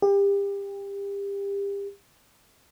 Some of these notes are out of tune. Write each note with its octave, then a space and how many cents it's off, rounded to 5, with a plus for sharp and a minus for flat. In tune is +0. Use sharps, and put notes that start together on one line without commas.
G4 +30